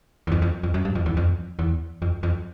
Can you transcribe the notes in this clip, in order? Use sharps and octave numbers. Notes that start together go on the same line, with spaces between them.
E2
F2
F2
F2
F#2
G2
F2
E2
F2
E2
F2
F2